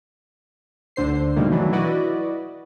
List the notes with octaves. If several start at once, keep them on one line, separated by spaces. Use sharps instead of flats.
D2 D3 C5 C7
B2 D#3 G3 A3 A#3
E3 F#3 D4
E4 F#4 B4 D5 D#5